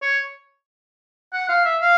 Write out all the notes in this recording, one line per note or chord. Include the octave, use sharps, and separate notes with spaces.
C#5
F#5
F5
E5
F5